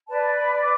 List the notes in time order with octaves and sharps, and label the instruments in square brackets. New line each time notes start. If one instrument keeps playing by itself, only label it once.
[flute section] B4 D5 [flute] A5
[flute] B5
D6